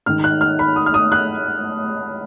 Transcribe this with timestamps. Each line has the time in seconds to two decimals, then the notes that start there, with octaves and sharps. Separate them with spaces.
0.06 G#2 D#3 F6
0.24 F#6
0.41 F6
0.59 B5
0.76 D#6
0.86 F6
0.94 D#6
1.12 F#6